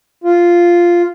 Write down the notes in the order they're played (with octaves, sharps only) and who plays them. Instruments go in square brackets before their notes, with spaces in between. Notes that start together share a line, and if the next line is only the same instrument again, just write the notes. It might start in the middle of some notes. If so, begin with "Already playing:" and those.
[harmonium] F4